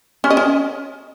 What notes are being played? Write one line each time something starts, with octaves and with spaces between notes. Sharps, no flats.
C#4
D#5
C#4